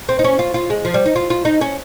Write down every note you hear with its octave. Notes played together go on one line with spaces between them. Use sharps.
C4
D#4
C#4
F4
F4
G#3
F3
G3
D#4
F4
F4
D#4
C#4